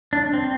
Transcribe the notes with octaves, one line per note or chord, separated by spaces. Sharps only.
D4
C4